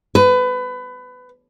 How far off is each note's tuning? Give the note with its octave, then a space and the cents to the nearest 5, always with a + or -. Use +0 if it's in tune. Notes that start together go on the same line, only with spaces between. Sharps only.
B4 +25